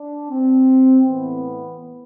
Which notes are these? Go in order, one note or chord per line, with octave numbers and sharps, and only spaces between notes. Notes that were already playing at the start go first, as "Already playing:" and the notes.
Already playing: D4
C4
A2 E3 B3